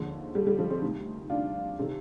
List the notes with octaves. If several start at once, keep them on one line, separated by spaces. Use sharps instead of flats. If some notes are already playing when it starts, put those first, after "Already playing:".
Already playing: D#2 D3 F3 G#3
G3
G3
F3 G#3
G#3 C4
D2 C3 D#3
D4 F4
C3 D#3